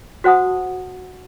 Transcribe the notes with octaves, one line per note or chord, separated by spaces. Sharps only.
F#4 C5 F#5 A5 D#6